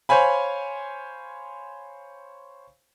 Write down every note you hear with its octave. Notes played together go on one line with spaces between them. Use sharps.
C5 C#5 F5 G#5 B5